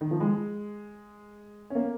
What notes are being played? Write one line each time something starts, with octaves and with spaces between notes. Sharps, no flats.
D#3
F3
G#3
C#4
A#3